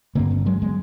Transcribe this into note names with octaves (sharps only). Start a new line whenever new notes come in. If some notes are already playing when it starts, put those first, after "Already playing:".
G2 D3 A#3 C4
B3 C#4
F#3 G#3
F#3 G#3